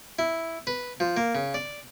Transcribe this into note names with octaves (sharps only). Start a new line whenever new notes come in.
E4
B4
F3
A#3
C#3
D5